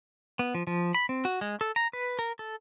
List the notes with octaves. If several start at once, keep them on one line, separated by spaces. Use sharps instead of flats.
B3
F3
F3
B5
C4
F#4
G#3
A4
A#5
B4
A#4
A4